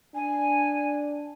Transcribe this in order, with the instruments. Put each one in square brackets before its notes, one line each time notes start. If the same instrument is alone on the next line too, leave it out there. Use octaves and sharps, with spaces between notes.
[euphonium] D4 [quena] G#5